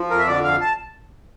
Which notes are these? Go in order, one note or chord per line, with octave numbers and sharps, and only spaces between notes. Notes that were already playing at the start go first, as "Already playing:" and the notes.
Already playing: F3
F2 A#4
E5
D3 D5
F2 F5
A5